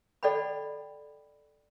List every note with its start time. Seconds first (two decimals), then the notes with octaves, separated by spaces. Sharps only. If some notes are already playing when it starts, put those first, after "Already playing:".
0.23 A4 D5 D#5 F#5 G5 B5